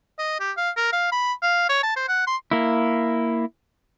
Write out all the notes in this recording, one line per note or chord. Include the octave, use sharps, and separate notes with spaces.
D#5
G4
F5
A#4
F5
B5
F5
C#5
A5
C5
F#5
C6
A#3 E4